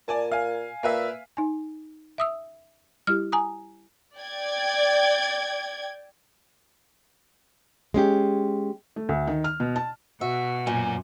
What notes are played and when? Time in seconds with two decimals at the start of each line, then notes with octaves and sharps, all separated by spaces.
0.08 A#2 D5 G#5 A5
0.32 F5 G#5
0.83 A#2 A#3 B4 E5
1.37 D#4 G#5
2.18 E5 D#6 E6
3.07 G3 E4 G4 F6
3.32 G#5 A#5 D#6
4.19 D5 G5 G#6
7.94 G#3 C#4 G4
8.96 A3
9.09 D2
9.27 D#3
9.44 F6
9.60 B2
9.76 A5
10.21 B2 F#4 E5
10.67 F#2 A#2 G#5